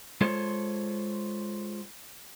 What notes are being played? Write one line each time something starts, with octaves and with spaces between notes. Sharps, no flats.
G#3 F4 A4 C5 C#5